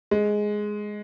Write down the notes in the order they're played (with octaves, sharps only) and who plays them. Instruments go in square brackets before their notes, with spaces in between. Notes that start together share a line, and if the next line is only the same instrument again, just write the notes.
[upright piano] G#3